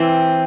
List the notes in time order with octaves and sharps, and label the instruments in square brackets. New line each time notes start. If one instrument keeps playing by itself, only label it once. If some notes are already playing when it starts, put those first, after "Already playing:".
Already playing: [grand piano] E3 [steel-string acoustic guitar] C4